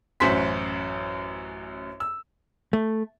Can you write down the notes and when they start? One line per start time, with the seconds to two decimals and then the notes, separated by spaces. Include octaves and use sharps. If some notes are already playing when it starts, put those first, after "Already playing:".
0.20 A1 F#2 F#4 C5 C6 B6
2.00 E6
2.73 A3